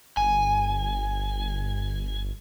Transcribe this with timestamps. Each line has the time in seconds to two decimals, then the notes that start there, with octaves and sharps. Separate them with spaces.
0.17 G1 G#5